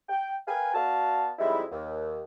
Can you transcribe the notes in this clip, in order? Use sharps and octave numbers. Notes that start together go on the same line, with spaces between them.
G5
A#4 B4 F5 G5 G#5
B3 F#4 D5 F5 A5
F2 G3 G#3 D#4 E4
D#2